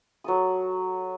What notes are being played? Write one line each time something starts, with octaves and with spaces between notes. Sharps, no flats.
F#3 A4 D#6